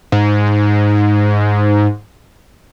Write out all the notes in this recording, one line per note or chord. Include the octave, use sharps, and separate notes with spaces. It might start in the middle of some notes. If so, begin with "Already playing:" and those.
G#2